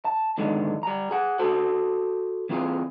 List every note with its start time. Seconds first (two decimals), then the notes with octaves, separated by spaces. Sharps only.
0.05 A5
0.38 E2 G#2 D3 D#3 G#3
0.83 G3 A#5
1.11 G#4 F#5
1.39 F#4 A4 C5
2.49 E3 C4 F4 G#4